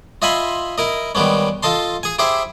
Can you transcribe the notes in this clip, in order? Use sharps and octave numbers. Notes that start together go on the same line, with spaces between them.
F4 D#5 E5 G#5 B5 C6
E4 A#4 D#5
D#3 G3 G#3 B3 C#4
F4 A4 D#5 A5 C6
G#4 G#5
E4 G4 G#4 C5 E5